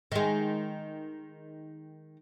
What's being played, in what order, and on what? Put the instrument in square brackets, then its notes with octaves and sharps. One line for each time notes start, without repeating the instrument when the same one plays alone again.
[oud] D#3 G#3